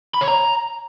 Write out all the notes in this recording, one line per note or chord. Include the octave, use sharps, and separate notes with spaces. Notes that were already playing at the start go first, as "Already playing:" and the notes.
B5
C#5
A#5